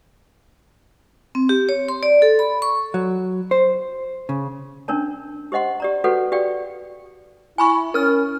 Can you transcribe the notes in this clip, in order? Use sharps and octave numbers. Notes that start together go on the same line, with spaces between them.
C4
G4
C#5
C6
D5
A4
B5
C#6
F#3
C5
C#3
C#4 D4 A#4 C#5 A5
G4 C5 D#5 F#5 C6
G4 D5 A#5
F#4 G4 A4 B4 C#5 F#5
F#4 G4 D5 F5 G5
E4 G#5 B5 C#6
C#4 A#4 F6